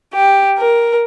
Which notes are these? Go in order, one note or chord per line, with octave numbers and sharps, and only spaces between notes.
G4
A#4